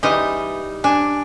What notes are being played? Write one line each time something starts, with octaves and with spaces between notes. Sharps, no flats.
E3 G3 G#3 D#4 D#5 C6
D4 G#5